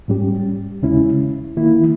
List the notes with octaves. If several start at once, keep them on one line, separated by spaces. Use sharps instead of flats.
G#2 G3 C#4 G4
D#2 C#3 G#3 C#4 E4
D#3 A#3 E4